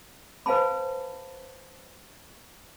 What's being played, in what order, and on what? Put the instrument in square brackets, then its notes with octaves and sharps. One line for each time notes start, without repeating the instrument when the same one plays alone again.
[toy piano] B4 C5 F5 G#5 A5 B5